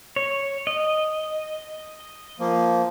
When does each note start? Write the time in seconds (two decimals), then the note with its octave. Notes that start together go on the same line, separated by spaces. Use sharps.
0.16 C#5
0.67 D#5
2.39 F3 A#3